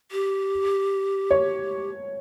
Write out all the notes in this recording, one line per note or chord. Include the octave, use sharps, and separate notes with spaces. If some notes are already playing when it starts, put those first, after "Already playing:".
G4
C#5